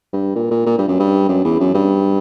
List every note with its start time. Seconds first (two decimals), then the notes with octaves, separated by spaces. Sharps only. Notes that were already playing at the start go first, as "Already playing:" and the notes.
0.13 G2
0.35 A#2
0.51 A#2
0.67 A#2
0.78 G2
0.88 F#2
1.00 G2
1.29 F#2
1.45 E2
1.60 F#2
1.75 G2